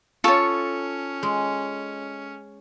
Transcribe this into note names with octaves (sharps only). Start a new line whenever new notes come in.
C#4 F4 A4 C#5 C#6
G#3